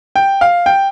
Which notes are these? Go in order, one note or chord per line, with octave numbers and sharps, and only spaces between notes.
G5
F5
G5